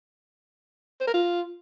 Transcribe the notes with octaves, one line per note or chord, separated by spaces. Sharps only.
C5
A#4
F4